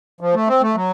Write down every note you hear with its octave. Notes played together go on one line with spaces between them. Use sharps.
F3
A3
C4
A3
F#3